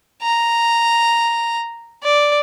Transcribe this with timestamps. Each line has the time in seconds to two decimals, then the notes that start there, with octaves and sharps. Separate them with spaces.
0.23 A#5
2.04 D5